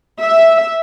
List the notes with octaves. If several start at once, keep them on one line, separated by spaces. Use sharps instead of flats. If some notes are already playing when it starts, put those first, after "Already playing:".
E5